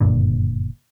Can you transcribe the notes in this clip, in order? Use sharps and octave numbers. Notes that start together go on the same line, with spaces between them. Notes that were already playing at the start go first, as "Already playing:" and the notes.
F#1 G2 A#2 D3